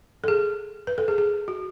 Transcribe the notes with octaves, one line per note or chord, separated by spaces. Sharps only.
A4
G#4
B4
A4
G#4
G#4
F#4